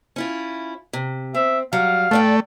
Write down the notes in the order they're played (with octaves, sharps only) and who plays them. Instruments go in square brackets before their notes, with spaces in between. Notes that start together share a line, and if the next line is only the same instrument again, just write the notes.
[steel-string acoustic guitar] C#4 E4 F4
C3
[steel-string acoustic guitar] C4 [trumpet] E5
[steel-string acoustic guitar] F#3 G3 [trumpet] F5
[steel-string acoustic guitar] A2 D5 G5 [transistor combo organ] A3